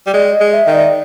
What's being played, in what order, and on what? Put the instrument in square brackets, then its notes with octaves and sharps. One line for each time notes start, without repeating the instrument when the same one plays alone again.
[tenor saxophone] G3
[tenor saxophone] G#3 [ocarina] D5
[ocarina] D#5
[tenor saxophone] G#3
[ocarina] E5
[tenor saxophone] D#3
[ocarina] D5